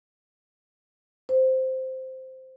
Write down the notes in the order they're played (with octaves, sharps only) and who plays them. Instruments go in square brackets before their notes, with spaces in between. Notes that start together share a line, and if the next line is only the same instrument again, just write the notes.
[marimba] C5